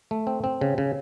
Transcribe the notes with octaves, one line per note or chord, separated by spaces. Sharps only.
A3
C4
C4
C#3
C#3